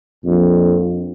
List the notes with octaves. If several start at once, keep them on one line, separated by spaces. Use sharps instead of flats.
A#1 F2